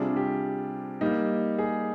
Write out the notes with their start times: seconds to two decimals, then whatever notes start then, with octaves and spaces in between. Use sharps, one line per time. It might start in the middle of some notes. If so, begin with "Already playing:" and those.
Already playing: C3 G3 D4 F4 G#4
0.16 G4
1.01 G3 A#3 D#4
1.58 G#4